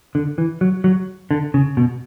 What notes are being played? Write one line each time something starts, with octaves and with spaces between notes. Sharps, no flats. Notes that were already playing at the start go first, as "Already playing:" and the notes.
D3
E3
F#3
F#3
D3
C#3
B2